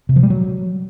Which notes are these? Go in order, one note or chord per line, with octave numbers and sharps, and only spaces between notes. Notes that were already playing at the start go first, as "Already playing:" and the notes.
C3
F3
G3
F#3